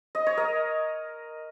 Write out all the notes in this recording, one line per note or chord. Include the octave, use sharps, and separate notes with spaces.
D#5
C#5
A#4 D#5